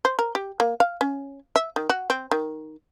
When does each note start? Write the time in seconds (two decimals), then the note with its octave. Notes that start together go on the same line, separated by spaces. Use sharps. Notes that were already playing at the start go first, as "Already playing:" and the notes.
0.05 C5
0.19 A#4
0.35 G4
0.60 A#3
0.80 F5
1.01 C#4
1.56 E5
1.76 D#3
1.90 F#4
2.10 C4
2.31 D#3